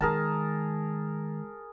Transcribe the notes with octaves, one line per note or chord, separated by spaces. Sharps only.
D#3 G#3 G#4 A#4 A5